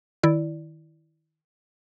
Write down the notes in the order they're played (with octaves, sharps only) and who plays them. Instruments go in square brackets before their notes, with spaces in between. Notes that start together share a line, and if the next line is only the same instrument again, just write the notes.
[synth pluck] D#3 E4 D5